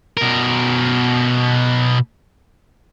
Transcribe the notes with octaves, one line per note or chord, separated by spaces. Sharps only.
B2 A#4